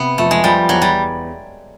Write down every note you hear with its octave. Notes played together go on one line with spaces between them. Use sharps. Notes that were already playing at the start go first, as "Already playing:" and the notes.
Already playing: C3 B3
F2 A3
G#3
F3 G3
E2 F#3
G3